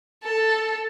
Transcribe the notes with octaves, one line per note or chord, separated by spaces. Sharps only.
A4